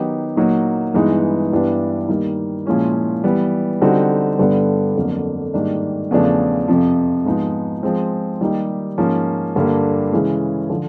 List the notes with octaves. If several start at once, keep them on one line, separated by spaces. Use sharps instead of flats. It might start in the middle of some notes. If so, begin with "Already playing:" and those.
Already playing: D#3 F#3 B3 D#4 G4
A#2 F#3 A#3 D#4 F#4
G2 E3 G#3 B3 D#4
G2 E3 G3 B3 D4
D#3 G3 A#3 D#4
A#2 F3 G#3 C#4 E4
E3 G3 B3
D3 G3 C4 D#4 F#4
G2 D3 G3 B3 D4
F2 D3 F#3 A#3
G#2 D#3 G3 A#3 D4
E2 C#3 F3 A3 D4
F2 C3 F3
G#2 F3 G#3 B3 D#4
F3 G#3 C4
D#3 G3 A#3 D#4 G4
G#2 F3 A#3 C#4
G2 D3 G3 A#3
C#3 E3 G#3 C#4
D3 F3